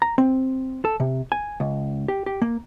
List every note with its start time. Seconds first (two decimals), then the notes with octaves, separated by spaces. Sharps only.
0.02 A#5
0.18 C4
0.85 A4
1.00 C3
1.32 G#5
1.60 C#2
2.08 G4
2.26 G4
2.42 A#3